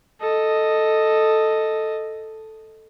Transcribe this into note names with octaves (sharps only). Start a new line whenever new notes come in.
A4 D#5